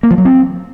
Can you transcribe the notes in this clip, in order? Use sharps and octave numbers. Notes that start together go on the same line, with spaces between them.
A#3
F3
F#3
C4